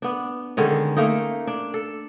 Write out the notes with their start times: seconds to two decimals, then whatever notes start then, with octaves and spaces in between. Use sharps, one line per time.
0.02 B3 D4
0.57 D3 D#3 G#3 C#4
0.97 A3 A#3 D#4
1.47 D4
1.74 A4